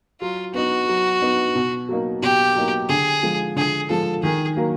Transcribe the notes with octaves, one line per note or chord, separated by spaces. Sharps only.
F#3 F4
B3 D#4 F#4
F#3
B3 D#4
B2
F#3 A#3 D#4
B2 G4
F#3 A#3 D#4
D3 G#4
F3 G#3
D3 G#4
F3 G#3 A4
D#3 G#4
F#3 A#3